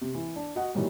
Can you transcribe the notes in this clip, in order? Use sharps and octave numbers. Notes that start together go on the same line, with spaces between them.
C3
E3
D4
F#4 D#5 F#5
A#2 D#3 E3 F#3 G3